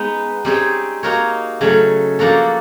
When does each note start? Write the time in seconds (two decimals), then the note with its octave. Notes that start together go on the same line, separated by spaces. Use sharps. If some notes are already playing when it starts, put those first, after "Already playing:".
Already playing: G#3 B3 D#4
0.45 G3 C4 D#4 G#4 C#5
1.03 A#3 D#4 F#4 A#4 C#5
1.61 C#3 F#3 A3 C#4
2.19 F3 A#3 D4 F#4 A4